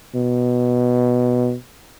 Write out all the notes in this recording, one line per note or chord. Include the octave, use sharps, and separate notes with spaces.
B2